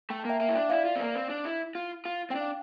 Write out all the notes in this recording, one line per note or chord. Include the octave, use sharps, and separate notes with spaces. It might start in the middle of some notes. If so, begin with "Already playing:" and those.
A3 G5
A5
A#3 E5 G5
A#3 E5 G5
E4
D4
E4 D5 F5
F4
C4
A#3
C4
D4
E4
F4
F4
C4 D4 G5
F5